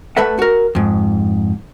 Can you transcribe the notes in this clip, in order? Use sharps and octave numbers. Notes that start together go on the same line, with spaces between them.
A3 A4 B4 E5 F#5
F#4 A#4
F2 G#2